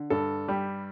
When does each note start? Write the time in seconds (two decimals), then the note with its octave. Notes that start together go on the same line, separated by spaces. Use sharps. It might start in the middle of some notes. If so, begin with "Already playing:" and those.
Already playing: D3
0.10 G2 A4
0.48 G3 G4